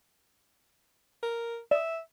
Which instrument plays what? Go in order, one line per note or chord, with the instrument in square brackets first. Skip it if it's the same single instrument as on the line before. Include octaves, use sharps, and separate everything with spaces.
[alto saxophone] A#4
[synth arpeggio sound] D5 D#6 [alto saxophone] E5